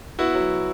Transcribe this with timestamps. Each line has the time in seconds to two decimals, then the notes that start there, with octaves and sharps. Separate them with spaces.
0.19 B3 E4 F#4
0.35 F#3